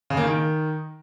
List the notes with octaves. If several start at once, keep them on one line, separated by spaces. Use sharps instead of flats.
C#3
A#3
D#3